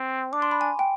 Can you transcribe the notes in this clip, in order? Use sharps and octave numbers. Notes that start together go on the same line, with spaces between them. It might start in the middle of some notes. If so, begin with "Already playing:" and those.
Already playing: C4
D4 D6
C6
B5
G#5
G5